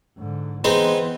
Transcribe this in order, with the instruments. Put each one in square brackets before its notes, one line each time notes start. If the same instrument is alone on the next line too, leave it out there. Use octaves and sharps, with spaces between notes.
[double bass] G#2 D3
[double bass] E3 B3 [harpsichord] G#3 C4 D#4 [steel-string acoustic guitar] B4